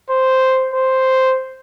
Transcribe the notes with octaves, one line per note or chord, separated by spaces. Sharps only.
C5
C5